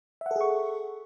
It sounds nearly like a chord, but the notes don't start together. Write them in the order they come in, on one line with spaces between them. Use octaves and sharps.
E5 F#5 A4 G#4 C#6